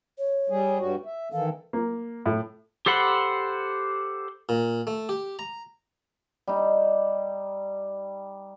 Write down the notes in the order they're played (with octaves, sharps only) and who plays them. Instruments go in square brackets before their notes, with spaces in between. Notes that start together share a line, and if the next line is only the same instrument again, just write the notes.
[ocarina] C#5
[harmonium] G3 G#4
G2 G3 F#4
E5
[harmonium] D#3 E3 A4 [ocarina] F5
[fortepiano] A#3
A2
[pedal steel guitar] G4 A4 C5 F#5 B5
[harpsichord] A#2
A3
G4
A#5
[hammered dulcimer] G3 D#4